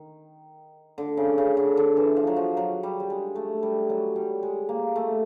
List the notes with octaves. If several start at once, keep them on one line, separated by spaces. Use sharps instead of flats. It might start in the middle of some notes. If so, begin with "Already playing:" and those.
Already playing: D#3
D3
C#3
C#3
D3
D3
E3
F3
F#3
F3
F#3
G3
G3
G#3
A3
G3
F#3
G3
G#3
A#3
A3